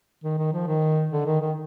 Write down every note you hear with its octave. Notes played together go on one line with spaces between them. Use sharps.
D#3
D#3
F3
D#3
D3
D#3
D#3